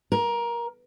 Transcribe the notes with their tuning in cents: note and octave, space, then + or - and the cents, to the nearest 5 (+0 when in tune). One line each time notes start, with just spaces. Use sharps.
A#4 +20